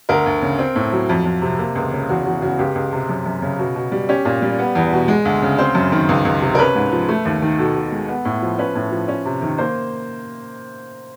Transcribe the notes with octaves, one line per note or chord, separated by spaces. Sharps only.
D2 A#4
D2
C#3
C4
A2
F#3
F2
F2
C3
A#3
C#2
C#3
E2 F#4
E2 F#4
C#3 F#4
C#2 G4
C#2
C3
F#2
F#2
C#3
B2
B2
G3
C#4 G4
A#2
G3
B3
E2
B2
G#3
D2
C#3
C4 C5
F#2
D#3
C#2
C#2
C3
A#4
C#4 B4
G#2
F3
A3
D#2
D#3
B2 A4
B2
G#3
B3
A2
F3
C#4 B4
A2
F3
C#4
C3
D#3
A#3 C5